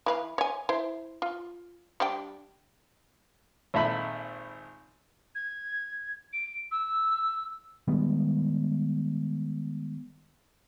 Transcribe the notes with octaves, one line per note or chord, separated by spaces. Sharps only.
E3 B4 F5
C#5 G#5
E4 C5
F4
G3 D4 G5
G#1 A#2 A3 E5 B5
G#6
D7
E6
D#3 G3 G#3 B3